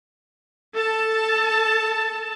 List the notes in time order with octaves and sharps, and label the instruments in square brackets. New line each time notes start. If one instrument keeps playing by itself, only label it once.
[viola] A4 A5